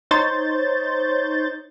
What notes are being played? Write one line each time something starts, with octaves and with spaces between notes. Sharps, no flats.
D#4 C5 C#5 G6 A6